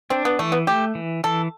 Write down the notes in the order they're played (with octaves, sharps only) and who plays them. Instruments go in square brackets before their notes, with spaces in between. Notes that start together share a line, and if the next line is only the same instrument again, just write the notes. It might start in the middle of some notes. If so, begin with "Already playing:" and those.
[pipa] C4 [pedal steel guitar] D4
[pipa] B3
[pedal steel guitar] E3 [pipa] A3
[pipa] B3
[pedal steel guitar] A3 [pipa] G4
[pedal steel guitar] E3
[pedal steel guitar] E3 [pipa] A4